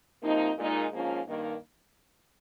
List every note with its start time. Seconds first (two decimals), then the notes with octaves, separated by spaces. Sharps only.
0.22 C3 F3 A#3 D#4
0.57 A#2 G#3 D#4
0.91 G#2 F3 A#3 C#4 F4
1.27 G2 D#3 A#3